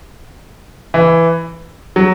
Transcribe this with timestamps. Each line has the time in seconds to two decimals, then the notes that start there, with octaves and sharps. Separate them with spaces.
0.94 E3
1.96 F#3